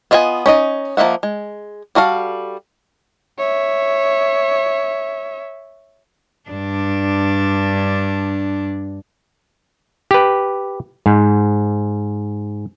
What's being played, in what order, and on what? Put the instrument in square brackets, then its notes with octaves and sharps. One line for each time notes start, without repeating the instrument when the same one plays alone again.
[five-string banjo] B3 F4 D#5 E5 G#5
C#4 D#4 D#5
F3 A#3 D#5 E5 F#5
G#3
G3 F#4 A4 F5
[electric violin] C#5 E5
[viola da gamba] G2 D4
[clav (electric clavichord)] G4 B4
G#2